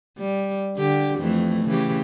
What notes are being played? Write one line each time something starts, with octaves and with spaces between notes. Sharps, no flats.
G3
D3 G4
F2 E3 A3
C#3 E3 G4